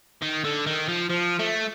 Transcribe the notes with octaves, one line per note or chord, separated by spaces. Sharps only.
D#3
D3
D#3
F3
F3
A3